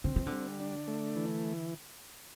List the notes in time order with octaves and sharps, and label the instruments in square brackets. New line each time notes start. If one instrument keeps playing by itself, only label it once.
[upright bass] D3 [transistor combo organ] C4
[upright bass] E3
D3
[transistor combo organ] G3
D4
A3
E3